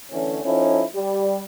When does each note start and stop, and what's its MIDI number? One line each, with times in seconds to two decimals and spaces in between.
0.11 0.40 50
0.11 0.40 52
0.11 0.40 57
0.11 0.40 61
0.45 0.83 53
0.45 0.83 61
0.45 0.83 63
0.45 0.83 64
0.45 0.83 69
0.95 1.42 55